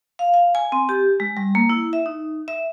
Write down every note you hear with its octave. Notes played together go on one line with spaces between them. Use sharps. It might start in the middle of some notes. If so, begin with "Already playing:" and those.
F5
F5
G#5
C4
G4
G#3
G3
A#3
E4
E5
D#4
E5